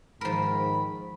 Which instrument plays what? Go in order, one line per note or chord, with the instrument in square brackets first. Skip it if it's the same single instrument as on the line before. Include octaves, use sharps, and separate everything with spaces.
[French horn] G#2 [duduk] D#3 [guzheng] F3 A#4 [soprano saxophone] B5